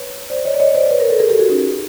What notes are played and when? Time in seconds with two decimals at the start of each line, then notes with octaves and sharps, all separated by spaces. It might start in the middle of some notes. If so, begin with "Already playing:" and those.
Already playing: B4 C#5
0.30 C5 D5
0.45 C#5 D#5
0.54 D5
0.60 C#5 D#5
0.74 C5 D5
0.90 B4 C#5
1.00 A#4 C5
1.10 A4 B4
1.20 G#4 A#4
1.30 G4 A4
1.40 F#4 G#4
1.49 C#4 D#4